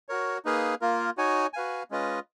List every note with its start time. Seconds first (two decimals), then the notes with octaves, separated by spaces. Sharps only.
0.09 F#4 A#4 C#5
0.45 A#3 D#4 G#4 B4 F5
0.81 A#3 F4 A#4
1.17 D#4 F#4 C#5 G#5
1.53 F#4 B4 F5 G#5
1.91 G#3 C#4 F4 B4 D#5